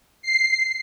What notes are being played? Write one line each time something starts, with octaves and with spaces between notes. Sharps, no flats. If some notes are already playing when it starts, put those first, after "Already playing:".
C7